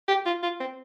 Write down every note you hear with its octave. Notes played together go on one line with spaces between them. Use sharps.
G4
F4
F4
C4